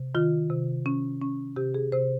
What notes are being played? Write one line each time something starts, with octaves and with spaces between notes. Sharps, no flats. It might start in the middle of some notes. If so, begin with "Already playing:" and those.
Already playing: C3
D#3 F4
C3
C#4
C#4
C3 G4
G#4
C3 C5